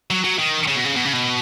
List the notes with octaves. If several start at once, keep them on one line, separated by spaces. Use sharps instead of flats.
F#3
F#3
D#3
C#3
B2
C#3
B2
C#3
B2